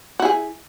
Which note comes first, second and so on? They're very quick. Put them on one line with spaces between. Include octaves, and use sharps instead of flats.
F#4 E4 G#4